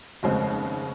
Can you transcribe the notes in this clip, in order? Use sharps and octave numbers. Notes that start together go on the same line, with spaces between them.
F1 D#2 C#3 G#3 C4